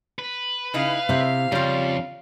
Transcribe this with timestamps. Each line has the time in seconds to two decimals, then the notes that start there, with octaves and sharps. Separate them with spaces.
0.19 B4
0.74 C#3 D#4 E4 F5
1.09 C3 E4 C5 E5
1.52 F2 C#3 G3 F4